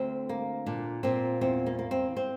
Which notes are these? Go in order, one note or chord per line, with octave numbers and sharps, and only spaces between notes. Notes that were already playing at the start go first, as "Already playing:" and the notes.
Already playing: D2 C4
A#3
A#2 D4
A#2 C4
E2 C4
A#3
A#3
C4
C4